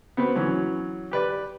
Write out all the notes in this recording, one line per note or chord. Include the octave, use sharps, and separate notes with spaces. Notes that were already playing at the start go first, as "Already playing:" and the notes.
B3 C4 F#4 B4
E3 F#3 C#4
G4 B4 D5